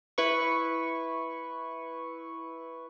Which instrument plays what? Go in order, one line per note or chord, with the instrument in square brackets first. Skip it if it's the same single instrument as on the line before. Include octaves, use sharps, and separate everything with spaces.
[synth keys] E4 B4 C#6